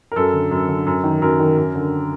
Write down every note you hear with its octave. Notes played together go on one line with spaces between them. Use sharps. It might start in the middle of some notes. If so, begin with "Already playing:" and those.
A#4
F#2 A4
D3
F#2
D3
F#2
D#3
F#2 A#4
D#3
F#2
D3